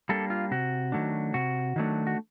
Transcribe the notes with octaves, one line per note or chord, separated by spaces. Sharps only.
G3 A#3 D4 A4
F4
C3 F#4
D#3 F#3 A3 D4
C3 F#4
D#3 F#3 A3 D4
F#4